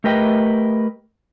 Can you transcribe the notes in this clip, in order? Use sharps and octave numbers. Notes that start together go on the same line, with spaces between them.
A3 G4 A#4 B4 D#5 G5